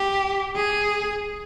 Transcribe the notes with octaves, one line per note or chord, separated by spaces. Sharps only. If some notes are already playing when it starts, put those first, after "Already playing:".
Already playing: G4
G#4